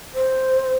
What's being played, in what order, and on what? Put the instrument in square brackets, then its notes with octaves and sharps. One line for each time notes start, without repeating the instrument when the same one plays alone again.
[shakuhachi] C5